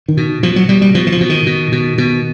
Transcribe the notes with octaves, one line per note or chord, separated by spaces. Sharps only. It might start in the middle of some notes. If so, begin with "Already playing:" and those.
D#3
B2
B2 F3
F#3
B2 G3
G3
B2 F3
E3
F3
B2
D#3
B2
B2
B2